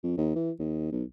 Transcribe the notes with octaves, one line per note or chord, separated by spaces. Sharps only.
F2
D#2
E3
D#2
B1